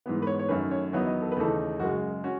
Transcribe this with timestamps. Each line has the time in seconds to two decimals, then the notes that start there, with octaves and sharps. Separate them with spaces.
0.06 G#2 E3 B3
0.22 B4
0.27 C#5
0.39 C#5
0.49 F#2 D#3 A3 C#4 B4
0.71 C#5
0.93 E2 D#3 F#3 B3 D#4 C#5
1.07 D#5
1.21 A4
1.32 B4
1.36 D#2 C#3 E3 A3 D#4 A4
1.79 F#2 C#3 G#3 F#4
2.24 C#4 F#4